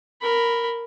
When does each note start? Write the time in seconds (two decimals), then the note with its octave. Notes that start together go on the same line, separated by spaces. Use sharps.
0.21 A#4 B5